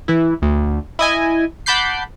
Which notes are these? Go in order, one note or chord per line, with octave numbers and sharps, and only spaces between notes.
E3 E4
D2
E4 D#5 G#5
F#5 A5 B5 D6 G6 C7